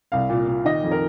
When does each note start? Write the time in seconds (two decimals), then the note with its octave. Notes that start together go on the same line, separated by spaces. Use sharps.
0.12 C2 F5
0.29 A#2
0.48 A#2
0.65 D#3 D#5
0.83 F2
0.91 A#4